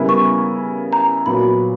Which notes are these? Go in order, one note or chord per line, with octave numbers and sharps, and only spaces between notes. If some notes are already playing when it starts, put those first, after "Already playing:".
Already playing: C#3 G3 B3 E4 A#4
C#6
A#5
A#2 F#3 B3 F#4 B5